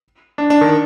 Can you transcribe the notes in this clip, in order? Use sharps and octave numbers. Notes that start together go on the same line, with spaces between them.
D4
D4
D#3